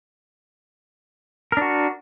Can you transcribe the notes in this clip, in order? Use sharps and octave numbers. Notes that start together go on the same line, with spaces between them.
D4 F#4 A#4